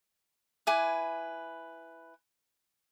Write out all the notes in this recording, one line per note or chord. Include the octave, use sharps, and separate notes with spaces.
E4 B4 G#5 D6